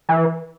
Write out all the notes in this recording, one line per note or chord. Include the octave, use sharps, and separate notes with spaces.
E3